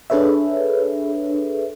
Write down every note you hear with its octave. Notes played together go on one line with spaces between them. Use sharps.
D4 G#4 A4 B4 C#5 E5